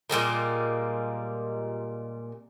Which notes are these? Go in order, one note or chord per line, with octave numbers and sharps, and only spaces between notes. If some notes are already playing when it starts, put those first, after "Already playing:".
A#2 G3 G#3 A#3